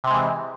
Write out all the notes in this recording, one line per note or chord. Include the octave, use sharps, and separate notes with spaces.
C3 E3 G#3 C4